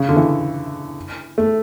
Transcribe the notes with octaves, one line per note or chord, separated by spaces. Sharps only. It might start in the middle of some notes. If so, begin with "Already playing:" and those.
Already playing: C#3
D3
E3
A3